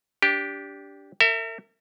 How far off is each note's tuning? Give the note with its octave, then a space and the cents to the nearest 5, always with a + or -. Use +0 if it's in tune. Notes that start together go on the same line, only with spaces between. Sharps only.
D4 -20 G4 +0
A#4 -45 E5 +0